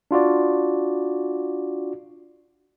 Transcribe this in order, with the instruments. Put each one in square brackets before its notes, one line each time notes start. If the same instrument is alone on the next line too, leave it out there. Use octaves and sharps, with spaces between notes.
[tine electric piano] D4 F4 F#4 D5